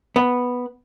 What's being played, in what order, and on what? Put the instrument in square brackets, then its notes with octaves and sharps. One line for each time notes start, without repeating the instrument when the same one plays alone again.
[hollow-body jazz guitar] B3